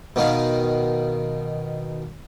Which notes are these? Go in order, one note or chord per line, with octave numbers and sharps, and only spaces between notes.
B2 D#3 F5